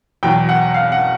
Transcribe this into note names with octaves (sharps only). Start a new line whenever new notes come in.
E2 B2 F#3 G5
F#5
F5
F#5